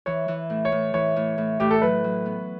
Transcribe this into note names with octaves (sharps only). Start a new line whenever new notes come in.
E3 C#5
E3
A2
C#5
A2
E3 C#5
A2
A2
A2 G4
A4
F#3 B4
F#3
B3